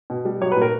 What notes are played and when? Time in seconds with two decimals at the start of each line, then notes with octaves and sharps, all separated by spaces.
0.10 B2
0.25 G3
0.41 F#3 C#5
0.52 B4
0.57 A#2
0.62 A#4